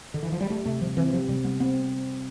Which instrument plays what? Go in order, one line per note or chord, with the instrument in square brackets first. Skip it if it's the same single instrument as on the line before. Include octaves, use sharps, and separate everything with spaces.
[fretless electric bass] D3
E3
F3
G3
[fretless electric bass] A3 [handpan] G4
[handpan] C3 [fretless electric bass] A3
[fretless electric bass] F3 [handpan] G3
[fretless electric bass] E3 [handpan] C4
[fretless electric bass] F3 [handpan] G4
[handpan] C3 [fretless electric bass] G3
[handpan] G3 [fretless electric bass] B3
[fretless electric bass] B3 [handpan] C4